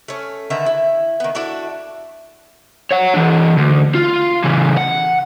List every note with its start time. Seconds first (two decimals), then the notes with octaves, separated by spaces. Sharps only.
0.08 A3 C#4
0.50 D3 D#3 B4 E5
0.66 E4
1.20 D#3 B3
1.35 D4 E4 F#4 A4
2.91 C#5 F#5
3.14 E3 D4
3.58 D2
3.95 F4
4.44 C#3 E3
4.78 F#5